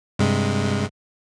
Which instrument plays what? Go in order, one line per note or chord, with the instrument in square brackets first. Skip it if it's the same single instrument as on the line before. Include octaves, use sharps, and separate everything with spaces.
[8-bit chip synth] G2 C3 G#3